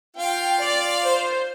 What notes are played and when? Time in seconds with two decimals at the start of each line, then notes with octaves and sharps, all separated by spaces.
0.17 F4 F5 G5
0.60 D5
1.04 C5